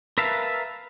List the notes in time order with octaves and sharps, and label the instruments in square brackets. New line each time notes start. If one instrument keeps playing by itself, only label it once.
[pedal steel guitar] A#4 B4 E5 F5 A5